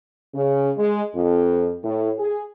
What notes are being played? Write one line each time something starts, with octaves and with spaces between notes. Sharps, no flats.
C#3
G#3
F2
A2
G#4